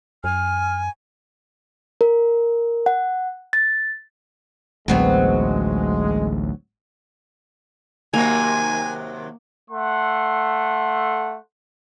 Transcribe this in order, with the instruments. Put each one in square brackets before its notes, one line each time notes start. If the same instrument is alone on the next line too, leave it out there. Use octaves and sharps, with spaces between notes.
[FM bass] F#2 [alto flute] G#5 [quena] F6
[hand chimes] A#4
F#5
A6
[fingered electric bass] A1 D2 [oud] F#3 B3 C4 [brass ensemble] G#3
[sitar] D#2 C3 F#3 [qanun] A#3 [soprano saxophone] G#5
[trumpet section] A3 A4 F#5 C6